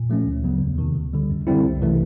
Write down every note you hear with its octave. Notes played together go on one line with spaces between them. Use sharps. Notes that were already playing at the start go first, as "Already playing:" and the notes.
Already playing: A#2
F3 A3 C#4
D2
C#3 F#3 B3
E2
C3 D#3
D2
D3 G3
F#2
D3 G3 C4 E4
C2
C3 E3 A3